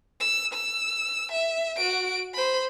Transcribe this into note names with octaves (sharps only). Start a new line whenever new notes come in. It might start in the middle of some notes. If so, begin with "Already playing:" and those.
E6
E6
E5
F#4 D7
C5 B5